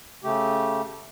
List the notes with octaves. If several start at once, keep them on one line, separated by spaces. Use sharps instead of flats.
C#3 A3 G4